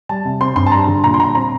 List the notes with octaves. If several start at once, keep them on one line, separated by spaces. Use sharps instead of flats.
G3 A5
C3
C4 C6
G2 C6
A5
G3 A#5
D3
A#2 A#5
C6
A#2 A#5
C6
C4 A#5